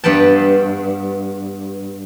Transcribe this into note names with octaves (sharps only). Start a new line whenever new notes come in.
G2 B3 B4 G5 A5